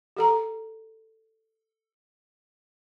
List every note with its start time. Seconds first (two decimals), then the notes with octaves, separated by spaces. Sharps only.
0.17 G4 A4 A#5